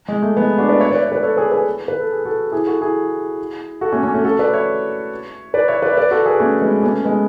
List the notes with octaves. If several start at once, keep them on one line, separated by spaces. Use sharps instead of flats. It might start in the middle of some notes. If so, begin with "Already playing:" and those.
G#3
A3
G#3 B3
D4 F#4
B4 D5
C#5 E5
B4 D5
C#5 E5
B4 D5
A4 C#5
G#4 B4
G#4 B4
B4
A4
G#4
F#4 A4
E4 G#4
F#4 A4
E4 G#4
F#4 A4
A3 C#4
A3 C#4
A3 C#4
F#4 A4
B4 D5
C#5 E5
B4 D5
C#5 E5
B4 D5
E5
B4 D5
F#4 A4
G#4 B4
A3 C#4
G#3 B3
A3 C#4
G#3 B3